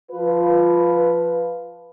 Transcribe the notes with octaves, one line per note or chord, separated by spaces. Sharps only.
F3 F4 B4